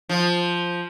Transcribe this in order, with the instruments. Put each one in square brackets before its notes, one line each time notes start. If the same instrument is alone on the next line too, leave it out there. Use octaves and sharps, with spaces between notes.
[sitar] F3